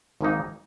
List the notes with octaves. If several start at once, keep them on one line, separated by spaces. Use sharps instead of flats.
G#1 G#2 D#3 A#3 D#4